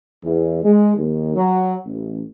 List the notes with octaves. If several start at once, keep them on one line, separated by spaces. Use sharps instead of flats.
E2
G#3
D#2
F#3
A1